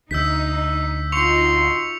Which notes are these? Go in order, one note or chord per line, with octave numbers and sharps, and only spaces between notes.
D2 D#4 E6 G6 B6
D#4 F4 F#4 C6 C#6 C#7 F7